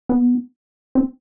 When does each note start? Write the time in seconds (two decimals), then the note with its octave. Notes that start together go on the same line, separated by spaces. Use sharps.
0.09 B3
0.95 C4